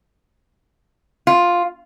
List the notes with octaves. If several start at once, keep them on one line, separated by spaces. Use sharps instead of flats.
F4